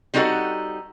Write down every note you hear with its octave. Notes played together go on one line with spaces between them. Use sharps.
G3 C4 D#4 F#4 A4 F#5